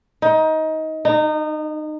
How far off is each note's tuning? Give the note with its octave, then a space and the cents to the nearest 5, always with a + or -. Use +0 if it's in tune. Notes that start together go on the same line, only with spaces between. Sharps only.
D#4 +20
D#4 -25